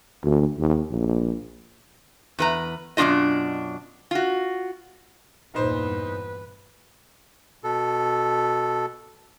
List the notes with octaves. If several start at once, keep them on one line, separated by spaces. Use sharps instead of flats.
D2
D#2
A#1
E2 B4 A#5
F#2 B2 B3 D4 F4 D#5
F4 F#4
E2 G2 A#2 D#4 B4 C5
B2 A4